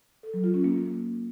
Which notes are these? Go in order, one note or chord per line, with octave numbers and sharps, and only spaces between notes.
A4
F#3
F4
C#4
A#3